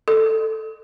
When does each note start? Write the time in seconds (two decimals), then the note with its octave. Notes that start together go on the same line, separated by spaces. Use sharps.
0.08 A4